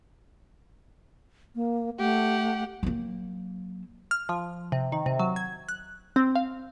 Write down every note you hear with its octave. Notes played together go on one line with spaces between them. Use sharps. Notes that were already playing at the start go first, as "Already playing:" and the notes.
A#3
A3 G4 F#5
F#3 A#3
F6
F3
C3
D#3
C3
F#3
G#6
F#6
C4
F5